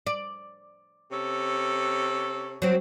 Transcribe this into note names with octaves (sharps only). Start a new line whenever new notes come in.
D5
C3 C#4 A4
F#3 C4